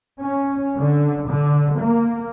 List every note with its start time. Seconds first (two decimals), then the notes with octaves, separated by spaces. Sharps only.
0.22 C#4
0.80 D3
1.29 D3
1.81 A#3